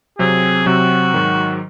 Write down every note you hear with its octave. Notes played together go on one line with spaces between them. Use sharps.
C3 F#3 C4 G#4
C3 F#3 C4 F#4
G#2 D#3 F#3